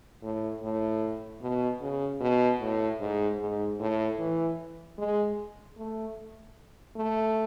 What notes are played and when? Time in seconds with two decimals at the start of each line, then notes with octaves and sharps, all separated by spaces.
0.22 A2
0.62 A2
1.41 B2
1.81 C#3
2.21 B2
2.60 A2
3.00 G#2
3.40 G#2
3.79 A2
4.19 E3
4.98 G#3
5.78 A3
6.96 A3